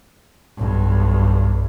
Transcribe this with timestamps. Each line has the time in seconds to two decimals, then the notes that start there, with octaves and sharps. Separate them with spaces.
0.57 B1 G2